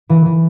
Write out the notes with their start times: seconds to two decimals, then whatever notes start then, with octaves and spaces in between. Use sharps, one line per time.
0.09 E3
0.25 E3